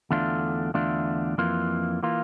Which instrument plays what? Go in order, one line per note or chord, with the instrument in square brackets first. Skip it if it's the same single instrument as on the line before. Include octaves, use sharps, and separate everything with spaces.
[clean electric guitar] E2 D3 A3 D4 F4
E2 D3 A3 D4 F4
F2 E3 A#3 F4
E3 A#3 F4